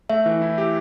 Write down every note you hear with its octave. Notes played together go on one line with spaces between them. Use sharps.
A3 E5
E3
E4
G4